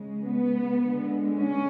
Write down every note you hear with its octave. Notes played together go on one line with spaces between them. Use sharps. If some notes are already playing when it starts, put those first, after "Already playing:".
Already playing: C#3 G#3
B3
D3 G#3
C#4